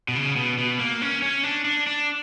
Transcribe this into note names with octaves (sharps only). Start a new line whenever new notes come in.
B2
C#3
B2
B2
A#3
C#4
C#4
D4
D4
D4